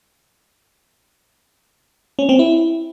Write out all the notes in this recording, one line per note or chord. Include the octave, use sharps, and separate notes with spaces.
C#4
C4
E4